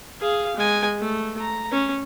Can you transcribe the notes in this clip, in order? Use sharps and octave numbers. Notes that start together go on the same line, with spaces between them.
G#4 F5
G#3 G#5
A3
A#5
C#4